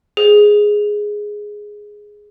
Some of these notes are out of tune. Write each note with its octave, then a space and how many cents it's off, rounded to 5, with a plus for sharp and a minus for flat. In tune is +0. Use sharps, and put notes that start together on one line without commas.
G#4 +0 C5 +0